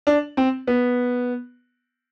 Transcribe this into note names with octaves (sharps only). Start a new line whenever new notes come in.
D4
C4
B3